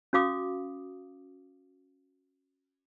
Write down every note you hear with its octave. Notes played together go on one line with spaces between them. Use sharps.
C#4 F#4 F5 D6 D#6